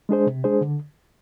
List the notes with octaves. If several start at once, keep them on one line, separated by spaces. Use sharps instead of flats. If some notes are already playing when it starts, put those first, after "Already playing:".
G#3 D4 G#4 C5
C3
G#3 D4 G#4 C5
D3